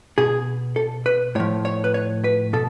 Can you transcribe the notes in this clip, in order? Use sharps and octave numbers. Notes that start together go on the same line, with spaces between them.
B2 G#4
A4
B4
A2 F3 C#5
C#5
B4
C#5
B4
B2 A4